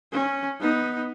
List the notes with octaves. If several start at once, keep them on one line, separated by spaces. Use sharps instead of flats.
C#4
B3 D#4